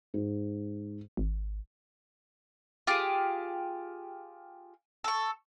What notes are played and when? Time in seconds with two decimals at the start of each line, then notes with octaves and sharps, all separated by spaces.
0.14 G#2
1.17 G#1
2.87 F4 G4 G#4
5.04 A4 C#6